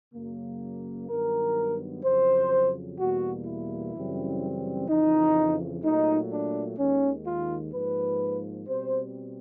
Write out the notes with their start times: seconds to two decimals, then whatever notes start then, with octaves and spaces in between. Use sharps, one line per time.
0.14 F#2 C#3 F#3 A#3
1.09 G2 D#3 F#3 B3 A#4
2.04 F2 C#3 F#3 C5
2.98 E2 B2 G3 A#3 F#4
3.46 E4
3.94 F#2 C#3 E3 G3 C4
4.89 F2 C#3 E3 D#4
5.83 A#2 F#3 A3 D#4
6.31 D4
6.78 D#2 D#3 G#3 C#4
7.26 F4
7.73 G#2 F3 A#3 B4
8.68 B2 G3 C4 C5